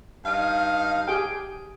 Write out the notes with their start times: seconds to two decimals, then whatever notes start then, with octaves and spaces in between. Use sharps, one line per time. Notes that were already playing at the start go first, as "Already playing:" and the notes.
0.25 G2 D#4 F5
1.08 G4 G#4 G5